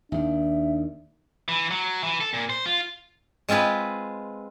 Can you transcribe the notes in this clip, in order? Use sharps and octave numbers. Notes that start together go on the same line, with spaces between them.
D#2 D#3 D4 E5
E3
F#3
E3
A4
A#2
C5
F4
G#3 C4 F4 G#4 B4